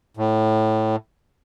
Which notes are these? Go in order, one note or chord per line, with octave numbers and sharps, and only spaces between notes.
A2